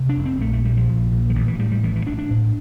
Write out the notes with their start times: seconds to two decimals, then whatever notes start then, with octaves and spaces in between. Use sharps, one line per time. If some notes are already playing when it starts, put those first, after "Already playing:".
Already playing: C3
0.09 D4
0.17 F1
0.26 C4
0.40 A#1 A3
0.53 A3
0.65 A#2 G3
0.77 F3
0.89 A#1
1.12 A#2
1.30 F3
1.35 A1 E3
1.48 E3
1.59 A2 G3
1.72 G3
1.83 A1 E3
1.95 E3
2.07 A1 D4
2.18 D4
2.30 A2